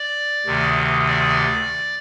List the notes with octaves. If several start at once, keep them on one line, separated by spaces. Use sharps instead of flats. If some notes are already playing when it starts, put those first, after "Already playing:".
Already playing: D5
D2 C3 D#3
D5